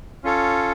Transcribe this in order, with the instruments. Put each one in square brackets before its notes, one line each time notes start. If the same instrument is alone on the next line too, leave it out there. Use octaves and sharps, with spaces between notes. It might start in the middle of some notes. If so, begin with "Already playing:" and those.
[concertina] C#4 F4 A4 C#5